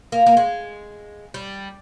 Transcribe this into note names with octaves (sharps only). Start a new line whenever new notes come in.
A#3
A#3
G#3
G3